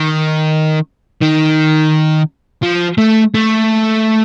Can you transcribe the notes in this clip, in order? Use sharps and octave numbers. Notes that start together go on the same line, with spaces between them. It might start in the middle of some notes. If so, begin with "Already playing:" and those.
Already playing: D#3
D#3
F3
A3
A3